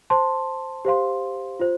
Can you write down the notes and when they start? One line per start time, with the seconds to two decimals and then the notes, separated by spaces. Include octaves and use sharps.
0.10 C5 A5 C6
0.85 G4 C5 F5 C6
1.60 F4 C5